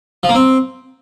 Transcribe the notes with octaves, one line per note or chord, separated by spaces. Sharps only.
F3
A#3
C4